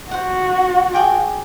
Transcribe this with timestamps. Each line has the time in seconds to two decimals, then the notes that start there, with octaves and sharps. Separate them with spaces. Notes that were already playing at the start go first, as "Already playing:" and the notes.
0.11 F#4 C5 F#5
0.93 G#4 G5 D6